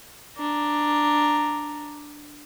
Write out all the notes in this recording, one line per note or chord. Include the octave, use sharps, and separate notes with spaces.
D4 A#5